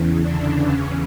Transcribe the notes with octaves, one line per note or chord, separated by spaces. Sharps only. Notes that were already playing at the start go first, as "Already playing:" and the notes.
Already playing: E2 C#3 E3
D3 D4
C#4